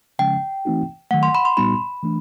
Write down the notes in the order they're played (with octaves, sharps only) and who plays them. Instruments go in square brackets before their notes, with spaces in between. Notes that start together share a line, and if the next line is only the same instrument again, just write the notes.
[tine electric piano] C#3 F3 G#3 C#4 [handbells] G5
[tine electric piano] E3 A3 C4 D#4 F#4
[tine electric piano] D#3 F#3 A3 [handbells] F#5
[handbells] C6
B5
C6
[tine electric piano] A#2 G3 B3 D#4 F#4 [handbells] B5
[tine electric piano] E3 A3 D4